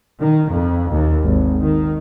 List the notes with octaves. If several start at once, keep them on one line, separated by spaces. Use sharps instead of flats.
D#3
F2
D#2
G#1
D#3